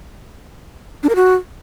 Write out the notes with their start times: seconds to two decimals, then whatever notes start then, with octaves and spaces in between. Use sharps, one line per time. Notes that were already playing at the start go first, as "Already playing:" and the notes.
1.03 D4
1.09 A#4
1.15 F#4